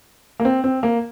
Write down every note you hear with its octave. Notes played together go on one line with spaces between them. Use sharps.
A#3
C4
C4
A#3